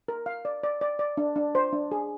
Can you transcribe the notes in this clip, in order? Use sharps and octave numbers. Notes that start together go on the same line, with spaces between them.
A#4
F5
D5
D5
D5
D5
D4
D4
C5
D4
G#4